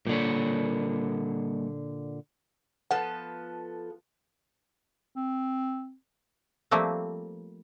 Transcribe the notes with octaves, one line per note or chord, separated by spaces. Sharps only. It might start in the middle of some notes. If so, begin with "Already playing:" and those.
A#2 D3 G3 A#3 C#5
F3 B3 A4 F#5
C4
F3 G3 A3 A#3 C4